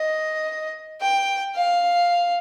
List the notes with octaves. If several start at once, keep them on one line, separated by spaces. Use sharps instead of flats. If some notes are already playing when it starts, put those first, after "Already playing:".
Already playing: D#5
G5
F5